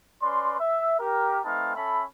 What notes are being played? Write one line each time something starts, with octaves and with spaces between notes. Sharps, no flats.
C#4 B4 D5 C6
E5
G4 A#4
A3 C4 D#4 B4 F5 A5
C#4 A4 E5 B5